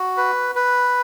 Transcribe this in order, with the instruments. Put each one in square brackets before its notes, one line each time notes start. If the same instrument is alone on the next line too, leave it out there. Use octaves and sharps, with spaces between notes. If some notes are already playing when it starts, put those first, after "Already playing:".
Already playing: [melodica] F#4
B4
B4